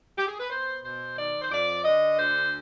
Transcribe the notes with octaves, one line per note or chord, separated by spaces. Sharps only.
G4
G#4
B4
B3 C5
B2 C5
D#3 D5
C5
F2 D5
D3 D#5
D2 C5